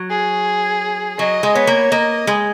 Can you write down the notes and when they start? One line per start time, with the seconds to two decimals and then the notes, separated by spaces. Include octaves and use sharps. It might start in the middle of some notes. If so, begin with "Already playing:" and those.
Already playing: F#3
0.10 G#4
1.19 F#3 D#5
1.43 G#3
1.55 B3 C#5
1.67 A#3
1.91 A#3 D#5
2.27 G#3